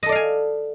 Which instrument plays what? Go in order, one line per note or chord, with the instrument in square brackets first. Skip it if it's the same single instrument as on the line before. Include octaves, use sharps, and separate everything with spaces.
[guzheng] D#5
A4
D5
F5
G#5